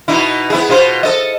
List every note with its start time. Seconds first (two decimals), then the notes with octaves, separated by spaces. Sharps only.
0.08 B2 D#4 E4
0.50 B3 E4 G#4
0.69 B2 F4 C5
1.03 A4 D#5